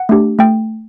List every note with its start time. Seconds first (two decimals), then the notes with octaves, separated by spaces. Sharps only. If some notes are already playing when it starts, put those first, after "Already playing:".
Already playing: F#5
0.09 A3 D4 G4
0.39 A3 G5